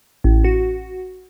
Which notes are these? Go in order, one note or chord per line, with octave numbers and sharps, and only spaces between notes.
A1
F#4